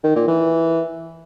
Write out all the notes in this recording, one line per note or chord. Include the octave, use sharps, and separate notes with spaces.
D#3
A#2
E3